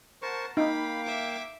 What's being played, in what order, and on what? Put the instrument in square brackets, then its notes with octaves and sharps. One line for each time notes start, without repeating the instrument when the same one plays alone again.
[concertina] A#4 C5 C#6 [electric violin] F#5 A5
[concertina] A#3 F5 G5 [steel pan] D#4 [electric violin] B5
[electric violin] E5 D6